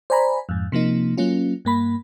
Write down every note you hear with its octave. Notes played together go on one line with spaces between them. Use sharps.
C5 D5 G#5 A#5 B5
F2 G#2
C3 F3 A#3 D#4
F#3 A#3 C#4 F4
G2 A#3 B5